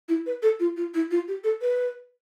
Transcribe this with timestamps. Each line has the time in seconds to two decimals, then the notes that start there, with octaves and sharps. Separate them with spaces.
0.08 E4
0.26 B4
0.42 A4
0.60 F4
0.77 F4
0.94 E4
1.11 F4
1.28 G4
1.44 A4
1.62 B4